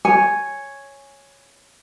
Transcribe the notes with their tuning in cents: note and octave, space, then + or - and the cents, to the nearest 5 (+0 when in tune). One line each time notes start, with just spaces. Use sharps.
C#5 +0 G#5 +0